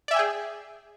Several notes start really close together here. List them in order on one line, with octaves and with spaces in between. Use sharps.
D5 E5 G#5 G5 G#4